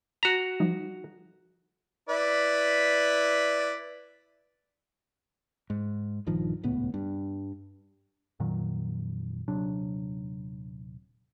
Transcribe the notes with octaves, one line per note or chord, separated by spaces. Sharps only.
F#4 A#5 B6
F3 G3 D#4
E4 B4 D5
G#2
A#1 G2 D#3 F3
D#1 C#2 A2 B3
G2 G3
F2 A#2 D#3 F#3
D#1 C3 F#3 D4